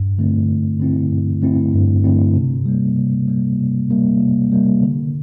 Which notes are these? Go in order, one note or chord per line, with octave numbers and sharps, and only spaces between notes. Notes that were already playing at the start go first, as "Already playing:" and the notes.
Already playing: G2
D3 A3 C4 E4
G2
D3 A3 C4 E4
G2
D3 A3 C4 E4
G2
D3 A3 C4 E4
C3
G3 A#3
C3
G3 A#3
C3
G3 A#3
C3
G3 A#3
D3